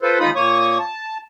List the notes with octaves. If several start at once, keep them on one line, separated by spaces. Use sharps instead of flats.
F4 A4 B4 C5
D#2 G#3 D#4 F4 B5 D#6
A#2 A#3 C#5 C#6 D#6
A5